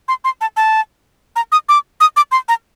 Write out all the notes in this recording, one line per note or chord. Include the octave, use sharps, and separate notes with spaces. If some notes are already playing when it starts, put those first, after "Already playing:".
C6
C6
A5
A5
A#5
D#6
D6
D#6
D6
C6
A#5